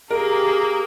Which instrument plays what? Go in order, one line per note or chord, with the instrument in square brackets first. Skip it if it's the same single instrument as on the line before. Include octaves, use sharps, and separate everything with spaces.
[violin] A#3 [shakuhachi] G4 [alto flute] G#4 [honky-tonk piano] A#4